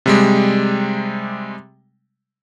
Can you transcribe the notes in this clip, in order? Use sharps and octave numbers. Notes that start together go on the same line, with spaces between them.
C3 G3 G#3